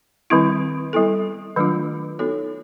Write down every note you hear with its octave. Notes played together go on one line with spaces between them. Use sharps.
D#3 G3 C4 E4
G3 B3 E4 A4
D#3 F#3 A3 D4 F4
B3 D#4 F#4 A4 C#5